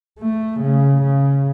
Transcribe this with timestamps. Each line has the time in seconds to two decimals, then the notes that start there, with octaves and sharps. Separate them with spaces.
0.19 A3
0.61 C#3
1.02 C#3